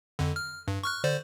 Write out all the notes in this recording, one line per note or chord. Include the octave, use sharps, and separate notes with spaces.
F2 D3
F6
G2
C#6 F6 F#6
D3 C5 D5